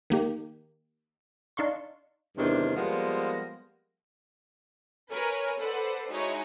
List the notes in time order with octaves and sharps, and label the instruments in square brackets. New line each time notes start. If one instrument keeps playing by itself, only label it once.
[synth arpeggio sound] D#3 A#3 G4
D4 D#4 F5 C6 C#6
[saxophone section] E2 G2 C3 D#3 D4
F3 G3 G#3 A#3 B3
[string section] A#4 B4 C#5 G#5
A4 B4 C5 D5 F#5
G#3 D#4 E4 F#4 C#5 G#5